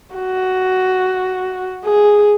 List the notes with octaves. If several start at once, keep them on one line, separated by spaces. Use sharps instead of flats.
F#4
G#4